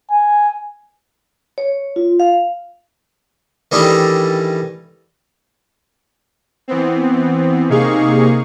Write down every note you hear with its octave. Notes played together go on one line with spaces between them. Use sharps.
G#5
C#5
F4
F5
D#3 E3 G3 A3 D4 D#4
E3 B3 C4
C3 A#3 D#4 G#4 F5 C#6